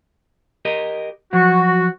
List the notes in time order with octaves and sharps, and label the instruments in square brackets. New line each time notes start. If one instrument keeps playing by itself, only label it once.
[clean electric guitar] G4 A#4 D#5
[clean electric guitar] F3 F#3 [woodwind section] F#4